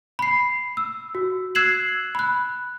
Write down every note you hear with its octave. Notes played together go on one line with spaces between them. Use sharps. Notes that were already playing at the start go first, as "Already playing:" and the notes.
B5 C7
E6
F#4
E6 F#6 G#6 C7 E7 F#7
B5 F#6